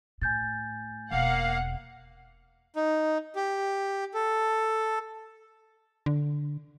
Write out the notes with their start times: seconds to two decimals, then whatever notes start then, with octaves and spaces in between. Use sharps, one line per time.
0.22 A2 G#5 G6 A6
1.11 E1 A#3 F5 F#5
2.76 D#4
3.36 G4
4.14 A4
6.06 D3